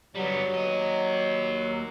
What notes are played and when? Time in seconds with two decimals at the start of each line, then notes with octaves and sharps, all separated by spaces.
0.15 F#3 G3 B3
0.54 A#3 D#5